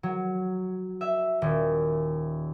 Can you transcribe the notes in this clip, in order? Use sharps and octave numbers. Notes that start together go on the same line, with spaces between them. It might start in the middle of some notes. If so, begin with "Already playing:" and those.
F#3
E5
D#1